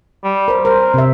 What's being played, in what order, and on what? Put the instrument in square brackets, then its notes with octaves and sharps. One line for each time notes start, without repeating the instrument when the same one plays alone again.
[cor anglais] G3
[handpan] A#4 C5
[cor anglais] A#4 [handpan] C5
[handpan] C3 E5